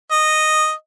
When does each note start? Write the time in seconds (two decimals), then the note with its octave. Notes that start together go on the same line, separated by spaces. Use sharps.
0.11 D#5